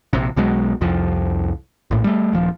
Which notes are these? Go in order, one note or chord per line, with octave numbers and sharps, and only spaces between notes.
A#1 C3
B1 B2 F#3 G#3
C2 F2 F3
A#1 A2
G3 A3
D#1 F3